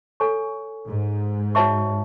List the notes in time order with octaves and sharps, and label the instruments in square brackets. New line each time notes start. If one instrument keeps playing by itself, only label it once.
[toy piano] A4 C#5 G#5 C#6
[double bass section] G#2
[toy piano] F#4 C#5 E5 A5 C#6